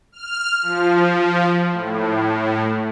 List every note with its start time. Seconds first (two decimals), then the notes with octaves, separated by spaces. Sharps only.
0.12 F6
0.62 F3
1.72 A2